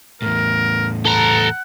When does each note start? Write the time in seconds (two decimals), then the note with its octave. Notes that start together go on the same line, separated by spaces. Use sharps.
0.22 E2 A2 A#4
1.05 A4 F#5 A#5